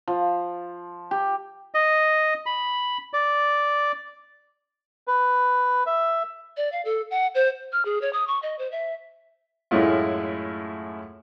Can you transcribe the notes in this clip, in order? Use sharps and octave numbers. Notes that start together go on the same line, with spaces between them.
F3
G4
D#5
B5
D5
B4
E5
D5
F5
A4
F#5
C5
F6
G#4
C#5
D#6
C#6
D#5
C5
E5
F#2 A2 G#3 A3 E4 F4